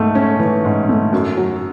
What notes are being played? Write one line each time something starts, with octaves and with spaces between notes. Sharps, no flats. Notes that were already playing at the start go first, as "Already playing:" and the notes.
Already playing: G#2 A3
C#4
E3
G#2
A3
F#2
F#3